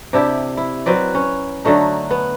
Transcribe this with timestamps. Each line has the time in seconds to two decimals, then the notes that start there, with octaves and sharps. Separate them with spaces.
0.13 C3 D4 E4 G4
0.57 E4
0.86 F#3 C4 B4 D5
1.15 C#4
1.65 D3 F#3 A3 D#4
2.11 B3